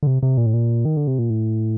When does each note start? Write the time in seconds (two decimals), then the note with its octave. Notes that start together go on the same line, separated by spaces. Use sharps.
0.03 D3
0.07 C3
0.23 C3
0.37 A#2
0.46 A2
0.54 A#2
0.85 D#3
0.97 D3
1.07 C3
1.19 A#2
1.30 A2